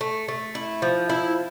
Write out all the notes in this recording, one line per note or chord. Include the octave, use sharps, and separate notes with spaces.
A3
A3
E4
F3
E4